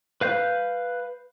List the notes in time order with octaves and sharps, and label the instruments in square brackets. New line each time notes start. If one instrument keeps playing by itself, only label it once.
[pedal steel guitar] B4 F5 G6